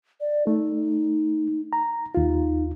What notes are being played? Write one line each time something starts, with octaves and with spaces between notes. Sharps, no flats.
D5
A3 D#4
A#5
D#2 D#4 F4